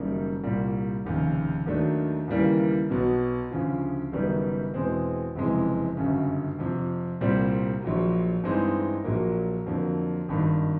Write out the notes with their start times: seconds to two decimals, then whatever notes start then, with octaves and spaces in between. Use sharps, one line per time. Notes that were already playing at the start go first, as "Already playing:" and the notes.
Already playing: F#1 F#2 D#3 G3 A#3
0.43 C2 A#2 G3
1.05 F1 D#2 C#3
1.66 D#2 D#3 F#3 A3 D4
2.27 D#2 C#3 E3 G3 A#3
2.89 B1 B2 F#3
3.51 D2 C#3 F3
4.12 F#1 F#2 D#3 G3 B3
4.74 E2 B2 G#3 C4
5.35 F#1 F2 C3 E3 G#3
5.97 G1 F#2 C#3
6.59 F2 C3 F3
7.21 C2 A#2 G3 C4
7.82 A#1 A#2 F#3
8.44 G2 E3 G#3 C4 D#4
9.04 A#1 A#2 F#3 A#3
9.67 F2 D3 F#3 A#3
10.29 G#1 G2 D#3